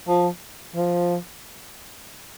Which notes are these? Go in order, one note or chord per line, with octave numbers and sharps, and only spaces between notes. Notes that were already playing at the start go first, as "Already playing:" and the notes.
F3
F3